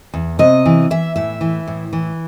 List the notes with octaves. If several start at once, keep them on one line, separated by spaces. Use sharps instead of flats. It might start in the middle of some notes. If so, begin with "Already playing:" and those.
E2
C3 D#5
E3
E3 E5
A2 E5
E3
A2
E3